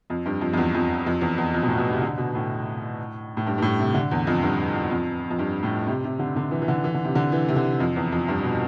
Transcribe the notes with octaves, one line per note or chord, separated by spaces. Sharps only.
F2
G2
F2
F2
E2
F2
F2
E2
E2
F2
B2
A2
B2
C3
D3
B2
A2
A2
G2
G2
A2
C3
D3
E2
F2
G2
F2
F2
G2
A2
C3
C3
D3
D3
E3
E3
D3
E3
D3
C3
D3
E3
C3
D3
F2
E2
F2
G2
B2